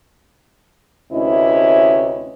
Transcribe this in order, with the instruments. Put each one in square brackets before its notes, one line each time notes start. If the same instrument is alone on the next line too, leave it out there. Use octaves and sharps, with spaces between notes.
[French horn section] D2 C3 C#4 E4 B4 D#5